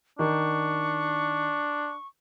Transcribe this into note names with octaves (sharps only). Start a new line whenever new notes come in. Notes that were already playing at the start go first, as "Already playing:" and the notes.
D#3 D4 C#6